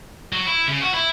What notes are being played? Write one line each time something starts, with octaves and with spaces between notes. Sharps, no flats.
F#3
E4
C#3
F#4
E4